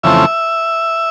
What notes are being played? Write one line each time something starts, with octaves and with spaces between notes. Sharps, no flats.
F2 C#3 E3 A3 C4 E5